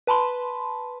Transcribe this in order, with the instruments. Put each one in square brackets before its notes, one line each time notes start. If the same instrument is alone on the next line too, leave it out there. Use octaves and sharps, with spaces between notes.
[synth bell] B4 A5 B5 C6